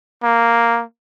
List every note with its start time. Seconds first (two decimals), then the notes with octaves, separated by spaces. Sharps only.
0.23 A#3